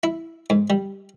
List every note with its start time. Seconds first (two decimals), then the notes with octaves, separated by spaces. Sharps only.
0.03 E4
0.50 G#2
0.70 G3